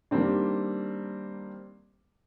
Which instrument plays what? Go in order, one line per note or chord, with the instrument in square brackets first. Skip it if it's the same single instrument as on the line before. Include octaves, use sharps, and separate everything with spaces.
[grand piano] D#3 G3 A#3 C4 D4